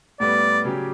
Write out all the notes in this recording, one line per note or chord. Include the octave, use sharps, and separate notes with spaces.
A2 G3 B3 D5
C#3 F#3 C#4 G4